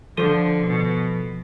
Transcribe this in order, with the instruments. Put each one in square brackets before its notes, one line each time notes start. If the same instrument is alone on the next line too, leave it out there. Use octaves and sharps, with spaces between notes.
[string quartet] D3 [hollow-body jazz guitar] F3 C5 [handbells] A4
[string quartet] B2